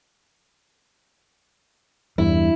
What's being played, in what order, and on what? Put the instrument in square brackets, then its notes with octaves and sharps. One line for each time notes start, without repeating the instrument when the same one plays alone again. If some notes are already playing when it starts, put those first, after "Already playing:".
[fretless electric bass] E2 G2 [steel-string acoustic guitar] E4